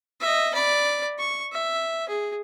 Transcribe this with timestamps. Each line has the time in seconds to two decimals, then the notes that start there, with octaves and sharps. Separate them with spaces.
0.20 D#5 E5
0.54 D5 B5
1.18 C#6
1.52 E5
2.08 G#4